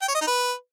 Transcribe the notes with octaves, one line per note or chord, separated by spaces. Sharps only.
G5
C#5
D#5
D#4
B4